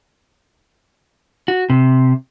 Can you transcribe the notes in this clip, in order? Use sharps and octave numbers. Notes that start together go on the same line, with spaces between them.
F#4
C3